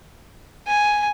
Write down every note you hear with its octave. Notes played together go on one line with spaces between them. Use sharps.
G#5